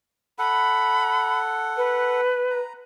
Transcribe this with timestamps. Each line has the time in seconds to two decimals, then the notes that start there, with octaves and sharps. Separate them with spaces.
0.39 A4 F#5 B5
1.77 B4
2.51 A#5